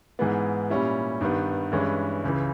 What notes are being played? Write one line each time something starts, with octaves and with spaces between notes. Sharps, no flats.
G#2 E3 G#3 B3
A#2 G3 C#4 E4
G2 D#3 G3 B3
G2 E3 G#3 C#4 E4
C#2 C#3 E3